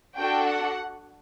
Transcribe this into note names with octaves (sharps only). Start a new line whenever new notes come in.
D4 F#4 A4 G5
F#5